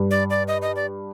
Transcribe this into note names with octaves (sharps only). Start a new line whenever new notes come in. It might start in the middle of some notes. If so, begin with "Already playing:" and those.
Already playing: G2
D5
D5
D#5
D#5
D5